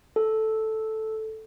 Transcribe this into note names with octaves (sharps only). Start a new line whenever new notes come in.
A4